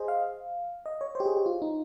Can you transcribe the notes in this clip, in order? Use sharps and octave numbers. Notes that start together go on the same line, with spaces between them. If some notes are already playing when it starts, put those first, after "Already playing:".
Already playing: G#4 C5 D#5
F5
D#5
C#5
C5
G4
G#4
G4
F4
D#4